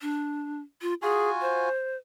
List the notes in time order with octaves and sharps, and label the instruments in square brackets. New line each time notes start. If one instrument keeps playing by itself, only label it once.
[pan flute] D4
F4
[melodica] F4 F#4 G#5 [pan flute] G#4
[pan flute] C5